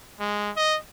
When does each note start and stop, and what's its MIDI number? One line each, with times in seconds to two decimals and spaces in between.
0.20 0.51 56
0.56 0.77 75